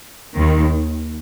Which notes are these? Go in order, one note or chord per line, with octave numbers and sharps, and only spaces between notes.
D#2 D#3